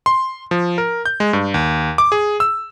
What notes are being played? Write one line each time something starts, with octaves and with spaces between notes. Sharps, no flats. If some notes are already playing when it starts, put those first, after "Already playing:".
C6
F3
A#4
G6
G#3
G2
D#2
D6
G#4
E6